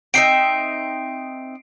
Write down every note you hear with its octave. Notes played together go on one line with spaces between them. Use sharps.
C4 D#4 E5 C7 D7